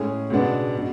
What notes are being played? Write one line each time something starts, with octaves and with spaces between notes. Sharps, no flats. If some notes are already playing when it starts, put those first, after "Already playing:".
Already playing: A2 G#3 C#4 G#4
C#2 B2 G#3 B3 D4
B2